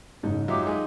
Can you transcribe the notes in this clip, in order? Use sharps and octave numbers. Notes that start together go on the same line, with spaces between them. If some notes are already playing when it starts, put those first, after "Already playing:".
F#1 G#2 D#4
F#3 D#4 F4 G4 E5 C6 D6
G#3 D#4 G#5